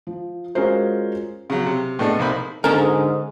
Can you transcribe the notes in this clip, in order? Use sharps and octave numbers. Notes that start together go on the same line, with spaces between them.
F3
G#3 C#4 F4 F#4 A#4 C5
C#3 F#3
C3
A2 B3 D4 G#4 A4 D#5
C2 A#3 D#4 C5 B5
G#2 D3 C#4 A4 A#4 A5 D#6